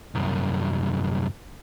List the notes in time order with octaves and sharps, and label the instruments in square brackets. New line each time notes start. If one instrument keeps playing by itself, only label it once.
[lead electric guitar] C2 F#2